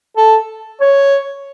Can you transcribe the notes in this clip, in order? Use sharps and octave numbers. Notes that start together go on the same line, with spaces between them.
A4
C#5